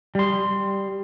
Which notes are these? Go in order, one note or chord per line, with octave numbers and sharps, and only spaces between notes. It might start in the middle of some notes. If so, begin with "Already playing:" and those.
G3 C6